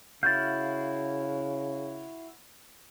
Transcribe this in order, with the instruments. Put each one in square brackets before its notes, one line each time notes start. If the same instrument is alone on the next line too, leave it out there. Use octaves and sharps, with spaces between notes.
[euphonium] C#3 [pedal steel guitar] E4 F#4 F5 [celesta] G6 A6